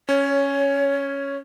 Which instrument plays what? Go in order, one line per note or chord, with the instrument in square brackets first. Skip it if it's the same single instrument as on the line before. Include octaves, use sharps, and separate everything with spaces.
[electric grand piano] C#4 [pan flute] C#5